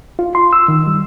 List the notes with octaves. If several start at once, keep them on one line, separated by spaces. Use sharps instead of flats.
F4
C6
E6
D#3
G3